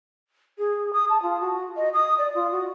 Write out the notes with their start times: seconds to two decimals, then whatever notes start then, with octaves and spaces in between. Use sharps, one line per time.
0.58 G#4
0.93 D#6
1.10 A5
1.22 F4
1.41 F#4
1.76 D#5
1.94 D#6
2.18 D5
2.35 F4
2.51 F#4